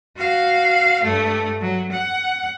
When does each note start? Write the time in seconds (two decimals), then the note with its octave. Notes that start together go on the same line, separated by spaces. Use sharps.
0.17 F#4 F5
1.04 G2 A3
1.61 F#3
1.92 F#5